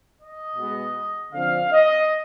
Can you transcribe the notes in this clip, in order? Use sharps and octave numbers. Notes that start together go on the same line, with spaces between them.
D#5
B2 G#3 B3
D3 F3 C4 F5
D#5